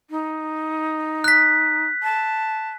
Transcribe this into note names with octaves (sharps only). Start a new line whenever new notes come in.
D#4
F#6 B6
A5